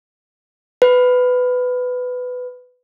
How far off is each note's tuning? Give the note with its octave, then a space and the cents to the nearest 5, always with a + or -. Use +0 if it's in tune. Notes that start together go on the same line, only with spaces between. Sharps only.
B4 +15